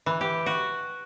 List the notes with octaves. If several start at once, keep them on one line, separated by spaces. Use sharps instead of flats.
E3
G4
F#4